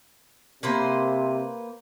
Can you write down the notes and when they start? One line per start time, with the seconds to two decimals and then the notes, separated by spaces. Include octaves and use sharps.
0.63 C3 A#3 B4 C5